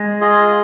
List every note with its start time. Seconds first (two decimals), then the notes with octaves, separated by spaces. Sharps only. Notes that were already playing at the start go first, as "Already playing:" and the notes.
Already playing: G#3
0.21 F4 G#4 D#5